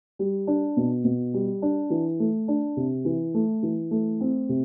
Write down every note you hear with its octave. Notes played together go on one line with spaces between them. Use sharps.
G3
D4
B2
B2
G3
D4
E3
A3
D4
C3
E3
A3
E3
A3
C4
C3